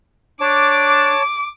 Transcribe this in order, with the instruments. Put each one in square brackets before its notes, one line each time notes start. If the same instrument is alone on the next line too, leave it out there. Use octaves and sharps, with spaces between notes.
[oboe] D4 [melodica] C#5 A5 [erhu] D6